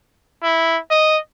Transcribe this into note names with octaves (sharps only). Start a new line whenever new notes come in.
E4
D#5